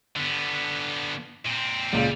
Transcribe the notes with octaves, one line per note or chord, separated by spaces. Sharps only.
D3 B3
A#2 C4
C#2 A#2 C#3 G3